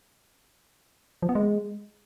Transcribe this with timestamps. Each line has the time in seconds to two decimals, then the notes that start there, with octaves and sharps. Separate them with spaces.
1.22 F3
1.29 B3
1.35 G#3